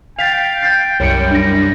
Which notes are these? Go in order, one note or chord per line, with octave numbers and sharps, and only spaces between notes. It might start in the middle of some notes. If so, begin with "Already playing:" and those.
F5 G5 A6 B6 F7
G6 A6 C7
C2 F#2 G3 C#5 C#7
D4 A#6